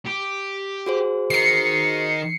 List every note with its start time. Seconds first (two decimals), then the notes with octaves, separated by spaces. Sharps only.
0.06 G4
0.86 F#4 G#4 C5
1.30 D#3 C7 C#7